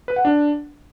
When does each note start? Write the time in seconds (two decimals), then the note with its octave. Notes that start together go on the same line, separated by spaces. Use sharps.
0.08 B4
0.16 F#5
0.25 D4